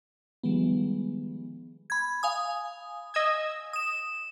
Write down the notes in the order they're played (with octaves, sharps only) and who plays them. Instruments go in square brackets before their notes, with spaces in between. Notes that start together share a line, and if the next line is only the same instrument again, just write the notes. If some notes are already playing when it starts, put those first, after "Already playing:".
[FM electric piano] D#3 F3 G3 G#3 B3
[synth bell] B5 G#6
F5 G#5 D#6
[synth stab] D#5 E6 G#6
[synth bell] D#6 E7